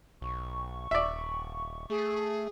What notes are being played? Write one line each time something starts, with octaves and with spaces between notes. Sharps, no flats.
B1 C#6
D#1 D5 E5
A3 G#4